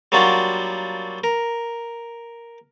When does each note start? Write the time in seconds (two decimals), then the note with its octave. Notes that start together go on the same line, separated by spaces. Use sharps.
0.12 F#3 G3 A#3 D4 F4 F#4
1.24 A#4